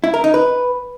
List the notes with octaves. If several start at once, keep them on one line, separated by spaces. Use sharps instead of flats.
E4
A#4
D#4
B4